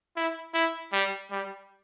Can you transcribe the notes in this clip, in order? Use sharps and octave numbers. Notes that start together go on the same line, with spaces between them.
E4
E4
G3
G3